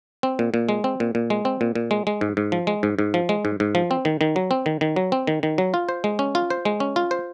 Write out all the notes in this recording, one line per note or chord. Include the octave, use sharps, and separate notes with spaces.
C4
A#2
A#2
G#3
C4
A#2
A#2
G#3
C4
A#2
A#2
G#3
G#3
G#2
G#2
F3
G#3
G#2
G#2
F3
G#3
G#2
G#2
F3
C4
D#3
D#3
F#3
C4
D#3
D#3
F#3
C4
D#3
D#3
F#3
F4
C5
G#3
C#4
F4
C5
G#3
C#4
F4
C5